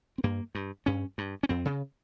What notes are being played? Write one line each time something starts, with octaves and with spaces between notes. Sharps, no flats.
C4
G2 A#3
G2
G2 C#4
G2
C#4
F2 C4
C#3